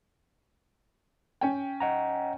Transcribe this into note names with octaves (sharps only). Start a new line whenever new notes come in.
C#4 G5
D#5 F#5 A#5